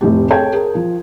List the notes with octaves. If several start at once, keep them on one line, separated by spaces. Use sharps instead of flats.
F1 A2 G4
G#4 A4 C#5 G5 A5 G#6
G#4 A#4
F3